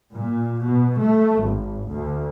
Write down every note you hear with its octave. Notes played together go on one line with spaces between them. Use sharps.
A#2
B2
A3
G#1
D2